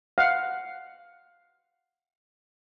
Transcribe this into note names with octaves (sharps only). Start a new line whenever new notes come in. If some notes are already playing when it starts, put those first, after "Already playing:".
F5 F#5